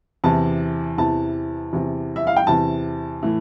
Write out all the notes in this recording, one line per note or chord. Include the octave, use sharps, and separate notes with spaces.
E2 C3 E3 A5
E2 C3 E3 A5
E2 C3 E3
E5
F5
G5
E2 C3 E3 A5
A2 E3